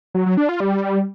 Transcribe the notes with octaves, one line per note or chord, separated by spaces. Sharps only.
F#3
F#3
D4
F4
G3